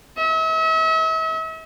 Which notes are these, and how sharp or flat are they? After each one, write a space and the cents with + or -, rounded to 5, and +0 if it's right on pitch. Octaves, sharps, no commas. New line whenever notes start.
E5 -40